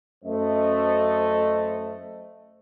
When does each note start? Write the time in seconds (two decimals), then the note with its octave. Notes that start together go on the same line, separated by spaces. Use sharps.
0.25 F#2 A3 C5 D#5